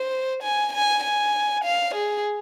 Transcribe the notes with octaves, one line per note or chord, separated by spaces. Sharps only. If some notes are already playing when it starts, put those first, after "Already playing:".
Already playing: C5
G#5
G#5
G#5
F5
G#4